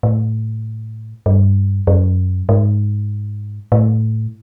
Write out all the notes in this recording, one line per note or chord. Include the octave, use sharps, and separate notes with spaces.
A2
G2
F#2
G#2
A2